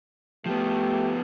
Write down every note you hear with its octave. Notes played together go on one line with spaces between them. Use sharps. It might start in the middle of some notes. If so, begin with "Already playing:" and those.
F3 A3 B3 G4